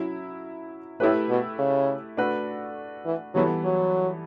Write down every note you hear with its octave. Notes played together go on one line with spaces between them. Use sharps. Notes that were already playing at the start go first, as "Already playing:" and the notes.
Already playing: F#3 C#4 E4
A2 A3 E4 G4 B4
B2
C#3
A3 D4 F#4 B4
E3
E3 F#3 G3 B3 E4 A4
F#3